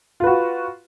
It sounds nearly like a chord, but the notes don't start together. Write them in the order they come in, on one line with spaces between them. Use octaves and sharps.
F4 B4 F#4